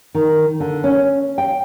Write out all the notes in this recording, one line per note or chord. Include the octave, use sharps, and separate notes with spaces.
D#3
D3
C#4
G5